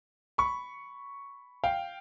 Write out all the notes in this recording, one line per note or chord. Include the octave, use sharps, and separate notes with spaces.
B5 C#6
F5 G5